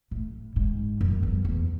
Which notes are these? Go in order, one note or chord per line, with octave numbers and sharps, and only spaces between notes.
A2
G#2
F#2
E2
E2